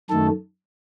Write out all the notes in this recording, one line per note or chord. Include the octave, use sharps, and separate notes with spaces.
F#2 D#3 A3 A4